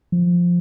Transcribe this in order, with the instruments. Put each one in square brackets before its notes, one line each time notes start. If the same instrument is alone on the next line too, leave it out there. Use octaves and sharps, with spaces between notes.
[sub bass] F3